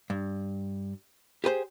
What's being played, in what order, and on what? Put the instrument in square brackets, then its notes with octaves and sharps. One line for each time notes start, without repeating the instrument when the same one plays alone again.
[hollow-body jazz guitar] G2
G4 G#4 B4 C5